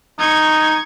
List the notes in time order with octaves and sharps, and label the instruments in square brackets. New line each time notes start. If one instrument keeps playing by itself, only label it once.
[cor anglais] D#4 [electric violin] C#6 G#6